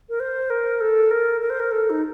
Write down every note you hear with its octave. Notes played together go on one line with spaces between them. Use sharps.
A#4
C5
A#4
A4
A#4
A#4
C5
A#4
A4
D#4